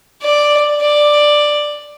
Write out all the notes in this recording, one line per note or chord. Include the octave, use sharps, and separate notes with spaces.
D5
D5